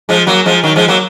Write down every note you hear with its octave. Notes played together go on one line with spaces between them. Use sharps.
F3 G#3
F#3 A#3
F3 G#3
D#3 F#3
F3 G#3
F#3 A#3